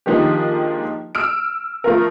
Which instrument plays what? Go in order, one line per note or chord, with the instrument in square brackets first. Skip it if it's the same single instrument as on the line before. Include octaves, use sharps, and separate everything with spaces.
[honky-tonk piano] D#3 F3 G#3 A#3 D4 G4
E6 F6 D7
F3 A3 F4 A#4